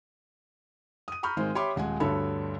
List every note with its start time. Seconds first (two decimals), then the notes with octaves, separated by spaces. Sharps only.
1.08 D#6 D#7
1.23 A#5 B5 C#6 F6 G6
1.37 G#1 D#3 G#3 C5
1.55 G4 C#5 E5 B5 C6 D6
1.76 D#1 G#3 F#5 G#5
2.00 D2 G2 D3 A4 C#5 B5